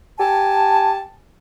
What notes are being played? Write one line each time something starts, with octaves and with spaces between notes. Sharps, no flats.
G4 G#5 A5